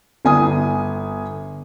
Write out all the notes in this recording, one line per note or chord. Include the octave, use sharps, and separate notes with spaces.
G1 G#5 D#6